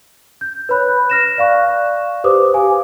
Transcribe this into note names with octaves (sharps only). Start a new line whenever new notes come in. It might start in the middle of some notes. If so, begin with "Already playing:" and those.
G6
B4 C#5 B5 F#6 G6
F6 A#6 E7
D5 F5 C#6 F#6
G4 B4 C5 D6 D#6
G4 F5 G#5